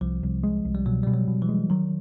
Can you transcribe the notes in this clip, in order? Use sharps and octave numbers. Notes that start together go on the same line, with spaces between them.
C2 F3
C2
G#3
C2
G3
B2 F#3
B2 G3
F#3
B2
E3
G#3
D#3 F#3